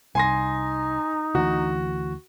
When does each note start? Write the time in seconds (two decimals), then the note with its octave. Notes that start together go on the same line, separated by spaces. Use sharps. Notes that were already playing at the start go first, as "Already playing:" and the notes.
0.15 C2 D#4 G#5 C6 A#6
1.35 D2 E3 F#4